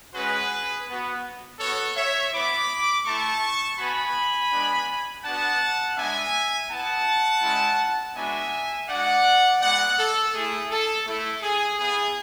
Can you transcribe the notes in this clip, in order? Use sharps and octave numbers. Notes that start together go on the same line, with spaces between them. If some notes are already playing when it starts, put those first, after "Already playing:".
G#3 C#4 F#4 G#4 B4
B3 F#4
B3 F#4 A4 C#5
C#5 E5
B3 E4 B5 D6
A3 E4 A5 C#6
B3 F#4 G#5 B5
G#3 B3 D4
B3 D4 F#4 F#5 A5
G#3 B3 D4 E5 G#5
B3 E4 F#5 A5
G#3 C#4 E4
G#3 B3 D4 F#4 E5 G#5
G#3 D4 F#4 D5 F#5
G#3 B3 F#4 D5 F#5
A4
A3 E4 G#4
A4
A3 E4 A4
G#4
B3 E4 G#4